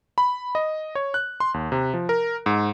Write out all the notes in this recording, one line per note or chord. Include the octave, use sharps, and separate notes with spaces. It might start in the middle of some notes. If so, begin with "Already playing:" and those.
B5
D#5
C#5
F#6
C6
D#2
C3
F3
A#4
G#2